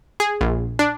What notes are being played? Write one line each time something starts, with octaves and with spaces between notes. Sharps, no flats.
G#4
A#1
D4